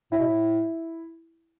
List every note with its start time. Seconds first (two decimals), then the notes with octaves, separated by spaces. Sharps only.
0.11 A2 E4
0.19 B2
0.26 A2